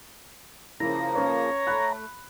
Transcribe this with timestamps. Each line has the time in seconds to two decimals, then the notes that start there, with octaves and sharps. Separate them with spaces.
0.80 C#3 F3 A#3 E4 A#5
1.15 C#4 B4 C#5
1.67 A3 B5 F#6